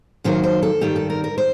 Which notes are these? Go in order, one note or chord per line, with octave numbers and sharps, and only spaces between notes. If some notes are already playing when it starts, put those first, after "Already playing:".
F#2 D#3 F#3 A#3 C5
C5
A4
G2 D#3 G3 G4
A4
A#4
A#4
C5